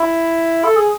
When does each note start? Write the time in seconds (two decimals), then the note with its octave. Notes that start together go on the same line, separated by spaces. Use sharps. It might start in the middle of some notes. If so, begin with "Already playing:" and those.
Already playing: E4
0.64 A4
0.77 G#4